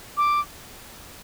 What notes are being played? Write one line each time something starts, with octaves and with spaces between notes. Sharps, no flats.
D6